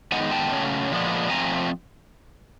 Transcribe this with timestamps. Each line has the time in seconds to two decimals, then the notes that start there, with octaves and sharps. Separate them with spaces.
0.12 D#3 G#3 B3 D#4 F#5 G#5
0.31 G5 A5
0.51 C#3 F#3 A3 C#4
0.90 A#2 F3 G#3 B3 D4
1.30 F3 A3 C4 G#5 A#5